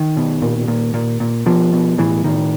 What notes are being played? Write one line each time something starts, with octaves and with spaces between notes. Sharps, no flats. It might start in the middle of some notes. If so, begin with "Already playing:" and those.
Already playing: D#3
B2
A#2
A#2
A#2
A#2
B2 F3
B2
A2 E3
A2 D#3